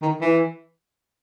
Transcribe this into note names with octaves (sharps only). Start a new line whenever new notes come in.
D#3
E3